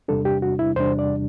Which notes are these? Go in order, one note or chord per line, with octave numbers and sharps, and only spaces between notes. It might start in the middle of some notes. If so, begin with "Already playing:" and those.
E2 C3 G3 D4 A4
G4
F#4
E4
E2 C3 G3 D4 C5
D5